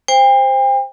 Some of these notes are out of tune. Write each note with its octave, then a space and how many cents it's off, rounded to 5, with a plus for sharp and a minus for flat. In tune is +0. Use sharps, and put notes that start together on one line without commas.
C5 +0 G5 +40